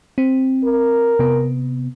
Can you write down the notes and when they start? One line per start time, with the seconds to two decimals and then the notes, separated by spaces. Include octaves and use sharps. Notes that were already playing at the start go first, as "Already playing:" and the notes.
0.18 C4
0.64 A#4
1.19 C3 B3